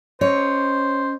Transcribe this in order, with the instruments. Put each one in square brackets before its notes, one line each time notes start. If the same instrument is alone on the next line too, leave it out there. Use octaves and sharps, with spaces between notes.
[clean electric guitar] C#4 D#5 [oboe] C5 [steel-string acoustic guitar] C#5